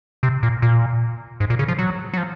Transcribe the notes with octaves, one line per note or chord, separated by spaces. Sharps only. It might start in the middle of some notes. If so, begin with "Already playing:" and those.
C3
A#2
A#2
G#2
A#2
C#3
F3
F#3
F#3
F3